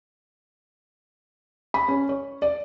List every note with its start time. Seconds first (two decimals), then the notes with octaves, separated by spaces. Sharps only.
1.74 B5
1.88 C#4
2.09 C#5
2.42 D5